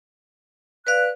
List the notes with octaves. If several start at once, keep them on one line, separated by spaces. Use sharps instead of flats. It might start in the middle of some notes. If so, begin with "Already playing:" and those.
B4 D5 F5 F#6